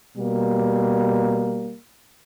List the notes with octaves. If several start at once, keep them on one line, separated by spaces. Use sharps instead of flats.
B2 G3 A#3